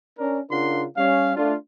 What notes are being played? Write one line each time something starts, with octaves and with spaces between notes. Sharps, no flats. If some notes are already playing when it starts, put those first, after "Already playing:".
C#4 D4 A#4
C#3 D4 F4 A#4 F#5 C6
G3 C#4 F5
A3 D4 F4